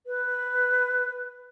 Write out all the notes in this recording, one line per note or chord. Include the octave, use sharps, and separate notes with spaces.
B4